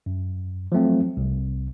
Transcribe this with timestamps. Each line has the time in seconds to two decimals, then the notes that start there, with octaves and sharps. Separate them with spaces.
0.06 F#2
0.72 F3 F#3 A3 C4
1.17 C2